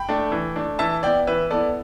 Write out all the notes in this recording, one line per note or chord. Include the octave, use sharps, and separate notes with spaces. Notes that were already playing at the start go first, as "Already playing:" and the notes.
Already playing: G5 B5
A3 D4
E3
A3 D4
E3 E5 A5
B3 E4 D5 G5
E3 B4 E5
B3 E4 A4 D5